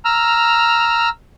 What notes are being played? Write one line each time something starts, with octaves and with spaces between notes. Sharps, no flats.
A#5 E6 F6